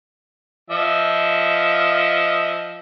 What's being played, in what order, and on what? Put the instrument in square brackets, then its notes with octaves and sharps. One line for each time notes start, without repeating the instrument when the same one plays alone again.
[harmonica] F3 D#5 E5